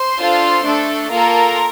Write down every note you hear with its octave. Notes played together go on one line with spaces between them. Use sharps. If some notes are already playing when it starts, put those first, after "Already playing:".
Already playing: C5 C6
D4 F4 A4
A3 D4 A4
A#3 F4 A4 A#4 A#5